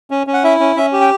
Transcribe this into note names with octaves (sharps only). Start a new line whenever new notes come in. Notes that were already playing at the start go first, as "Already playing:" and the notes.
C#4
C#4
F#5
E4 E5
C#4
C#4 E5
G4
G5